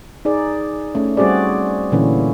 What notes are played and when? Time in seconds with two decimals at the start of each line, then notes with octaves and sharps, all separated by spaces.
0.25 D#4 G#4 D5
0.95 A3 C#4
1.17 G3 C4 F#4 G#4 D5
1.92 A#2 D3 E3 A#3 C#4 E4